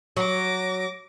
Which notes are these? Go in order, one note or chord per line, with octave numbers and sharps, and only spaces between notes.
F#3 D6 A#6